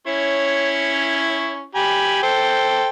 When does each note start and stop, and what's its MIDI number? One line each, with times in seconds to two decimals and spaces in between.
0.07 1.66 61
0.07 1.66 64
0.07 1.66 73
1.75 2.22 67
1.75 2.22 80
1.75 2.22 83
2.23 2.89 69
2.23 2.89 72
2.23 2.89 79